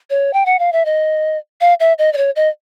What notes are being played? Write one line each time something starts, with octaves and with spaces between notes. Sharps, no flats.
C#5
G5
F#5
F5
E5
D#5
F5
E5
D#5
D5
C#5
D#5